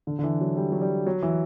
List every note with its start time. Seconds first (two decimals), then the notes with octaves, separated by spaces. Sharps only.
0.07 D3
0.19 D3
0.24 E3
0.41 F#3
0.57 G3
0.72 F#3
0.82 G3
1.07 F#3
1.22 E3